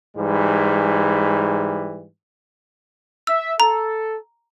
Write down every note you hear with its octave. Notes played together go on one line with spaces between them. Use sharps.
G#2 E3 G3
E5 E6
A4 A#5